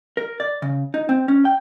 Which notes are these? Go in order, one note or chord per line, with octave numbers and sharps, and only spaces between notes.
A#4
D5
C#3
D#4
C4
C#4
G5